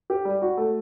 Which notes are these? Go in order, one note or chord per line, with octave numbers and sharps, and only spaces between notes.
G4
G3
F#4
A3